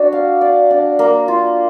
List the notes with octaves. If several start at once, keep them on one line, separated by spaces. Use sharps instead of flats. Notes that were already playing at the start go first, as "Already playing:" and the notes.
Already playing: D4 F#4 D5
F5
D5
D4
A#3
F4